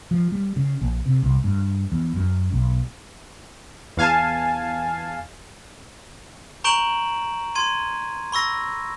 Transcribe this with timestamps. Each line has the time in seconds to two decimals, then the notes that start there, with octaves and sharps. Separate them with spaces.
0.11 F3
0.32 G3
0.56 C#3
0.81 A#1
1.06 C3
1.23 C2
1.44 G2
1.92 E2
2.16 F#2
2.52 B1
3.97 E2 F5 G#5 A5
6.64 A#5 C#6 G6 D7 E7 F#7
7.55 C6 G#6 D#7
8.32 B5 C#6 E6 A#6